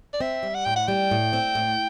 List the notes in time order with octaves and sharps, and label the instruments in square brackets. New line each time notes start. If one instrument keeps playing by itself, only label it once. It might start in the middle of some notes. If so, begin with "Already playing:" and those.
[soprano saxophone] D5
[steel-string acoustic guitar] C4 [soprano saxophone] E5
[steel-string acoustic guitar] G3
[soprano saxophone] F#5
[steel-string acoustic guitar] A2 [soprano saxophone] G5
[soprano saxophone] F#5
[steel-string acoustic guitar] G3 [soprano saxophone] G5
[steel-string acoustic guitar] A2
C4
A2